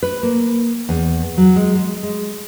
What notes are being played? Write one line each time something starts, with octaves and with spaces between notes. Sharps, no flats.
B4
A#3
E2
F#3
G#3
G#3
G#3